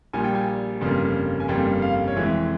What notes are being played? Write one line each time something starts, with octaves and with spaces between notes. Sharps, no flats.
A#1 A#2 G3 G#5
G5
G#5
G1 F2 C#3 G3 A#3
G#5
G1 F2 C#3 G3 A#3 G5
F5
C#5
F1 F2 E3 G#3 E5